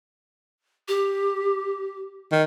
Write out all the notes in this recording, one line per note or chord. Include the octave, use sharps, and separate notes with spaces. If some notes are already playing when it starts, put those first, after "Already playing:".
G4
D#3